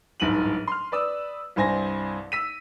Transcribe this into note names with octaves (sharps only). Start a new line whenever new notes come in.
D1 G1 G#2 D#7 F#7
C6 F6
B4 D5 D#6 E6
C2 G2 C5 G#5 A#6
E6 B6 D#7